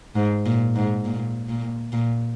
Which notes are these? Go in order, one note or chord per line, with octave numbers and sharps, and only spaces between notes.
G#2
A#2
G#2
A#2
A#2
A#2